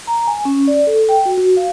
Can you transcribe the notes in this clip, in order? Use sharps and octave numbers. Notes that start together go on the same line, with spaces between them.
A#5
G#5
C#4
D5
A4
G5
F#4
F#4
F5